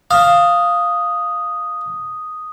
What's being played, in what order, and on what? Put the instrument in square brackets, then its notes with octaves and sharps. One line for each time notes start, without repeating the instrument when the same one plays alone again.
[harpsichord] F5 [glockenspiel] D#6